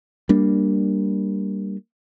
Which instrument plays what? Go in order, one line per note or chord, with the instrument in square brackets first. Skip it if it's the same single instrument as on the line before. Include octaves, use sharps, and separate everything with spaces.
[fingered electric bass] G3 A#3 D4